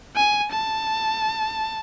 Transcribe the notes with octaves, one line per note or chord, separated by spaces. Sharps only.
G#5
A5